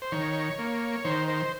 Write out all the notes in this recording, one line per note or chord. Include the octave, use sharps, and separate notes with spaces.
C5
D#3 C#5
A#3
D#3 C5
C5